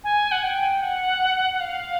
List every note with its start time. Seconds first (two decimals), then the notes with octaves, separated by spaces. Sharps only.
0.04 G#5
0.32 F#5
0.44 G5
0.82 F#5
1.60 F5